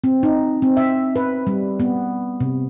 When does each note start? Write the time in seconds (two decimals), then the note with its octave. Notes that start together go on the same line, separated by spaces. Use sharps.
0.04 C4
0.23 D#4
0.62 C4
0.77 E5
1.16 B4
1.47 G3
1.80 B3
2.40 C3